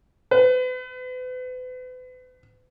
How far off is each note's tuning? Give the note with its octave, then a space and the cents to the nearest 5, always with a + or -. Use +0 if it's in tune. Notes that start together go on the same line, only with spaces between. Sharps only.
B4 +40